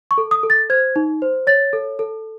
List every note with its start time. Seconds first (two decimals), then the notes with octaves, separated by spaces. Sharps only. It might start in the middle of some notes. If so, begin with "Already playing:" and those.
0.11 C#6
0.18 A4
0.31 D#6
0.43 A4
0.50 A6
0.70 C5 G#6
0.96 D#4
1.22 C5
1.47 C#5 A6
1.73 A4
1.99 A4